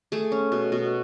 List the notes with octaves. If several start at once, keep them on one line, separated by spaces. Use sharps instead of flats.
A3 G#4
C#4
B2
B2